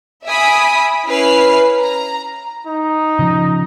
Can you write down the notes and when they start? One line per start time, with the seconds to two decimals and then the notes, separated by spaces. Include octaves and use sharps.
0.26 E5 G#5 B5 D#6 B6 D7
1.07 C#4 E4 B4 F6 C7
1.82 A#5
2.67 D#4
3.19 C#3 F3